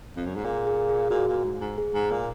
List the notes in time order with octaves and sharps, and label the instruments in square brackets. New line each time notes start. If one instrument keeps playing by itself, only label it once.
[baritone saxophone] F2
F#2
G#2
[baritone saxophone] A#2 [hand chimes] G#4
[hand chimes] G#4
G#4
[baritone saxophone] A#2 [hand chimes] F#4
[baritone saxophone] A#2
G#2
G#2
[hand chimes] G#4
[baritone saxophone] G#2
A#2